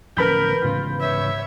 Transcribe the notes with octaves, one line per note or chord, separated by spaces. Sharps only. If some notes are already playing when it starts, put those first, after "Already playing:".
D1 F3 C#4 A#4 B4 B5 G6
G#2 C#3 E3 F4
C#5 E5